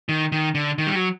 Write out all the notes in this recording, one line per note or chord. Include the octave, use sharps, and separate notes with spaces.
D#3
D#3
D3
D#3
G3
F#3